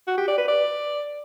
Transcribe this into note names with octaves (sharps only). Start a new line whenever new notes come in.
F#4
G4
D5
B4
D5